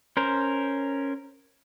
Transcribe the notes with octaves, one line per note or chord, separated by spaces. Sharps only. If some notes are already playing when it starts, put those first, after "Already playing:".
C#4 A#4 C5